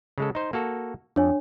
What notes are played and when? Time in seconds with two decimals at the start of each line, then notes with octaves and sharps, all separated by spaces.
0.18 C#3 G#3 A4
0.35 D#4 C5
0.53 A#3 F#4 A4
1.16 F2 D4 C#5 G#5